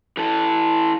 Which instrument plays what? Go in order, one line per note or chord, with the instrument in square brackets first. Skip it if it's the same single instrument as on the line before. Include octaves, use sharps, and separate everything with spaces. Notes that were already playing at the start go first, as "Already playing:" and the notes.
[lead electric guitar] E3 A4